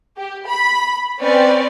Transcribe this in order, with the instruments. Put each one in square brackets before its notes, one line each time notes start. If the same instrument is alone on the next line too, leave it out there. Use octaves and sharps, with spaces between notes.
[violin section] G4
B5
C4 C#4 B4 D5